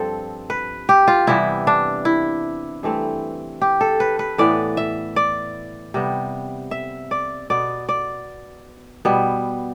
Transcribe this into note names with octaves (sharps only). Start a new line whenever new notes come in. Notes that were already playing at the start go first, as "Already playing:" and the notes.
Already playing: G2 F3 C4 A4
B4
G4
F4
C3 E3 G3 B3 E4
D4
E4
G2 E3 A3 C4
G4
A4
B4
B4
A2 E3 B3 D5
E5
D5
C3 G3 B3
E5
D5
B2 B3 D5
D5
B2 G3 B3